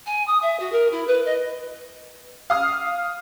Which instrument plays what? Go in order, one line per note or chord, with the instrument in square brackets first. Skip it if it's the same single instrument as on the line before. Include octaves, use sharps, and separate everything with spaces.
[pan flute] G#5
D#6
E5
F#4
A#4
E4
B4
D#5
[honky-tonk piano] F5 D#6 F6